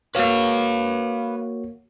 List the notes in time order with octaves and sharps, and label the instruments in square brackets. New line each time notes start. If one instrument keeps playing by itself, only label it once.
[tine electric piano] A#3 F#4 C#5 [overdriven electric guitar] B4 F5